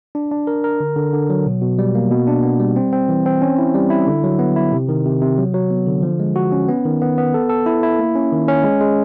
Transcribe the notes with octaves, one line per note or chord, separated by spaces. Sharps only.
D4
D4
A#4
A#4
D3
D3
D3
F#3
B2
B2
G3
A#3
B2
D4
B3
G3
C4
C4
E3
C4
C#4
E4
G3
E4
D3
F#3
B3
E4
C3
D#3
C3
C3
F#3
F#3
B3
D3
F3
G#3
F#4
C#4
B3
D#3
B3
B3
A4
A4
E4
E4
A#3
C#4
D#3
C#4
G#3
G#3